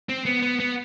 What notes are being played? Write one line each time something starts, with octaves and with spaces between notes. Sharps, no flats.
C4
B3
B3
B3